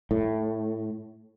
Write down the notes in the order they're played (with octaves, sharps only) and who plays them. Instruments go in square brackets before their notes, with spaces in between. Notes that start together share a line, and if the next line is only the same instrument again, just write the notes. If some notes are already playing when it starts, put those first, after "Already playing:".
[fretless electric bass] A2